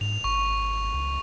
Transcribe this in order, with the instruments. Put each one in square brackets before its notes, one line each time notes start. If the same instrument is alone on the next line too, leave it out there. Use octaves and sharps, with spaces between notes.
[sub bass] G#2 [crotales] F7
[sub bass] G#1 [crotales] C#6
[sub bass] C#2